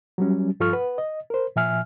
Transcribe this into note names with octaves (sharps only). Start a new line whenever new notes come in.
F#3 G3 C#4
G2 F3 F4 A4 C#6 F6
B4 F#5
D#5
A#4 C5
A#2 F3 E5 G#5 F6